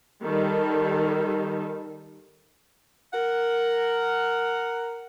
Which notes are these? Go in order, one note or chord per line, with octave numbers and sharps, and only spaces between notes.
D#3 G3 A4
A#4 F#5